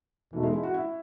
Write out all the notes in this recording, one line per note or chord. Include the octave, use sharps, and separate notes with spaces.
E2 B2 E3 A3 D#4
G#3
E4
F#4
E4